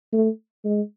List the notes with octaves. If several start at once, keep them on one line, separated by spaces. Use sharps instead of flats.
A3
G#3